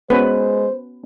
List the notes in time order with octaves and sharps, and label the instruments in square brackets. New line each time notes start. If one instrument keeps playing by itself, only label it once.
[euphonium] G#3 [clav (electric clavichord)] B3 C#4 F#4 [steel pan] B4 [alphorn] C5